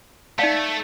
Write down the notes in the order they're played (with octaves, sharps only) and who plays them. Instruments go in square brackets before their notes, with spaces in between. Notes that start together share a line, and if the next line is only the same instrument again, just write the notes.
[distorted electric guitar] A3 [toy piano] D#4 D5 F5